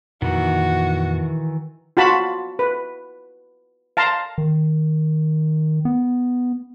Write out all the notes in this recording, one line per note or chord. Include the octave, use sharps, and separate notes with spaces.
F2 A#2 D#3 E3 A#3 F#4
F4 F#4 A5 B5
B4
F5 A5 A#5 C6
D#3
B3